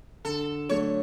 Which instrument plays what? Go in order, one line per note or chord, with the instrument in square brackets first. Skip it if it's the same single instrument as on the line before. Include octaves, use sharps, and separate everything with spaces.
[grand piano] D3 [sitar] A4
[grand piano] F#3 A3 D4 [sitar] C#5